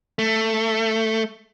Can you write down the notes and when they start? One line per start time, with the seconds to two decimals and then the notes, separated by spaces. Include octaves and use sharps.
0.19 A3